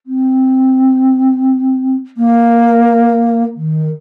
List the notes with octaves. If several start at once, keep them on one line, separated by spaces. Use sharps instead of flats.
C4
A#3
D#3